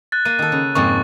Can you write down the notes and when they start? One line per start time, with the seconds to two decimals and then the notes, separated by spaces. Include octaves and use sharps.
0.12 F#6 A6
0.25 A#3 D#7
0.39 D#3 A4
0.52 C#3
0.75 F2 G#2 A#3 C#6 A6